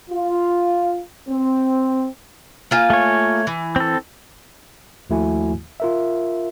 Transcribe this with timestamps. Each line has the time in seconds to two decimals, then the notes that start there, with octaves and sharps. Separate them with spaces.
0.10 F4
1.29 C4
2.71 A#3 F4 G#5
2.90 A3 C#5
3.47 E3
3.76 C4 A4
5.10 D#2 F3 A3 E4 F#4 G#5
5.80 F4 A#4 E5